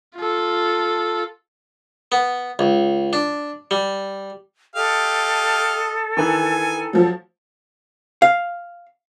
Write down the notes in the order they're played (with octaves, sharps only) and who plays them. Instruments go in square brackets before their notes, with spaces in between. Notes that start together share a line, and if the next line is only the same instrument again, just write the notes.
[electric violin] F4 A4
[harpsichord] B3
C#2
D4
G3
[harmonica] G4 D#5 F5 [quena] A4
[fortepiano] D#3 E3 [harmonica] G#5
[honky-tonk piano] F3 F#3
[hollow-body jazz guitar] F5